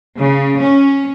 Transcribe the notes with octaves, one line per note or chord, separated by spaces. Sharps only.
C#3
C#4